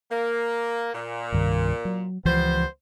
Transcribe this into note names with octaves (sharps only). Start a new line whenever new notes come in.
A#3
A#2
C2 G2 D#3
F#3
C#2 E3 F3 G3 B3 C5